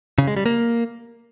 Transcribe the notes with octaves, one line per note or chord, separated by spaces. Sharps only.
C#3
G#3
G3
A#3